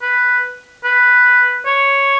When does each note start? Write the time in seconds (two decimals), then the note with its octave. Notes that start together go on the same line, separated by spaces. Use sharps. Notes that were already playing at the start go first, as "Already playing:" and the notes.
0.02 B4
0.84 B4
1.66 C#5